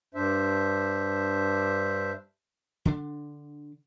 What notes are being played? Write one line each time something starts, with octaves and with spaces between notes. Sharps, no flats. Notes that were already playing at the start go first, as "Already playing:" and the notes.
G2 D4 C5 E5
D3 D4